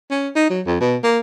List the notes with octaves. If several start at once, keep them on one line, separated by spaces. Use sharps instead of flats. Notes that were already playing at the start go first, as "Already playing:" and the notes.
C#4
D#4
F#3
F2
B2
A#3